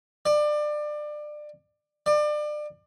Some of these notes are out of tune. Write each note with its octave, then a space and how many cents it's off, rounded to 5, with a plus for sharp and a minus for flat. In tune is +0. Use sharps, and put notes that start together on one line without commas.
D5 +25
D5 +30